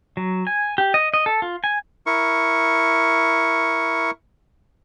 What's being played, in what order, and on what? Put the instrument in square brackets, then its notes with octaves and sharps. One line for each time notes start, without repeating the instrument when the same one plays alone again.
[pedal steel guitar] F#3
G#5
G4
D#5
D#5
A4
F4
G#5
[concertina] E4 A#4 C#6